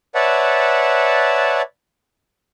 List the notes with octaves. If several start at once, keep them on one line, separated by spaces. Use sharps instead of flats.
B4 C#5 D5 E5 F#5 A5